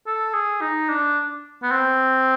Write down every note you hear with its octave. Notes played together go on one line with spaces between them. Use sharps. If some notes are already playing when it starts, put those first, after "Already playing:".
A4
G#4
D#4
D4
B3
C4